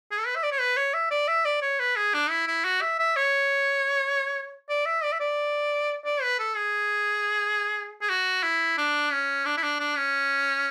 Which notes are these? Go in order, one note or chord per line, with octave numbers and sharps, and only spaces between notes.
G#4
A4
B4
E5
D5
C#5
B4
C#5
E5
D5
E5
D5
C#5
B4
G#4
D4
E4
E4
F#4
E5
E5
C#5
D5
E5
D5
E5
D5
D5
B4
A4
G#4
G#4
F#4
E4
D4
C#4
D4
E4
D4
D4
C#4